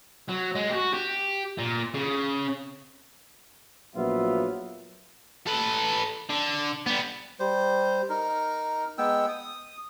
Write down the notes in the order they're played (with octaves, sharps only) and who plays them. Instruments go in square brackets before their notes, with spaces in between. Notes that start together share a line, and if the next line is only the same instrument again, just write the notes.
[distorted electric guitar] F#3
G#3
F#4 G4
G4
A#2
C#3
[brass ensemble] A#1 F#3 B3 F4 E5
[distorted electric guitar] A4 B4
D3
G3 B3
[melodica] G3 C5
D#4 A#4
G#3 B3 G5 E6
D#6